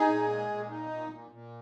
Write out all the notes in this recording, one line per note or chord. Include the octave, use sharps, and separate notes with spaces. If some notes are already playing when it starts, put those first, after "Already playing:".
Already playing: D#4 G#4
A#2
G#3
A#2
D#4
A#2
A#2
A#2